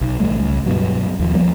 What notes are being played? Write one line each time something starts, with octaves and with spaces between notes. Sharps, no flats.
B1
A1 C3 G3 A3
C#2
G2 B2 F#3
D#2 F3
F3 G3 A#3 B3